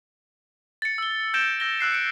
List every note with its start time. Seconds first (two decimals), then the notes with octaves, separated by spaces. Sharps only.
0.82 A6 C#7
0.98 E6 G7
1.34 G6 A6 A#6 D7 E7 G7
1.60 E6 G6 A#6 D7 G7
1.79 E6 F#6 C7 D7
1.92 C#7 D7